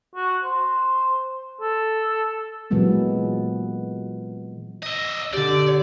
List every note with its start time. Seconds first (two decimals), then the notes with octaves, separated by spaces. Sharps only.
0.16 F#4
0.44 C5
1.61 A4
2.70 A#2 E3 F#3 G#3 B3 C4
4.83 D#5 E5
5.34 D3 G4 D5